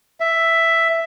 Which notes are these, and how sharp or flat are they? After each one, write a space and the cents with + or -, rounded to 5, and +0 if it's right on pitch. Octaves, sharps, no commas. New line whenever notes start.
E5 +5